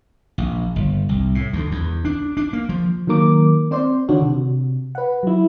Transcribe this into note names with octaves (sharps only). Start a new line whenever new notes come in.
A#1
G1
C2
A2
D2
E2
D4
D4
A#3
F3
D#3 F#3 A#3 A#4 D6
C4 C5 D5 C6
D3 D#3 D4 F#4 C#5
C3
B4 F#5
F#3 E4